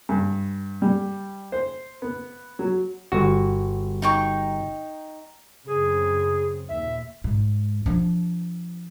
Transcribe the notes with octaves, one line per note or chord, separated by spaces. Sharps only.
G2
G3
C5
B3
F#3
G1 F#4
D#4 G5 C#6
F#2 C#3 C4 G#4
D#2 A#2 E5
G#2
F3 D4